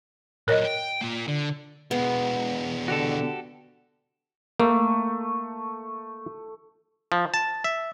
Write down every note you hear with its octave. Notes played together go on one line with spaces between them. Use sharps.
A#2 F#3 A#4 C#5 D#5
G5
A#3 F4
D3
B2 G#3 B3
D3 F#4 G4 A4
A3 A#3
F3
A5
E5